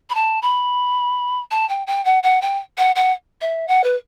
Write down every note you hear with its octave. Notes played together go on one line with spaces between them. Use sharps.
B5
A5
B5
A5
G5
G5
F#5
F#5
G5
F#5
F#5
E5
F#5
B4